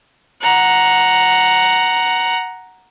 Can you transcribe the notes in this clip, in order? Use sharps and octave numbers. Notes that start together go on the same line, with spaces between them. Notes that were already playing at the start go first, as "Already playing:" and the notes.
F#5 A#5